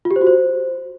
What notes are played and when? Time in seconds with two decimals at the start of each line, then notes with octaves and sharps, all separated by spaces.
0.05 F4
0.11 G4
0.16 C5
0.21 F#4
0.27 C5